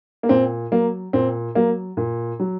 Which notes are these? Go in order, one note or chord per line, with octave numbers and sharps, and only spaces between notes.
A#3
A#2 C4
F#3 A#3
A#2 C4
F#3 A#3
A#2
F#3